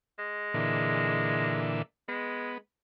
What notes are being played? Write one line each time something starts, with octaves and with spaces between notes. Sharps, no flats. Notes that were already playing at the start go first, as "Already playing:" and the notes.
G#3
A#2 D3 E3
G#3 B3